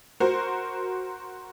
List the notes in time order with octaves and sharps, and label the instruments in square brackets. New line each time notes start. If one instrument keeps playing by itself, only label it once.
[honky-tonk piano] F#4 A#4 C5